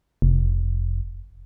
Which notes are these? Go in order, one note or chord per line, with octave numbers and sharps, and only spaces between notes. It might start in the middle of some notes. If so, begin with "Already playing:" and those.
F1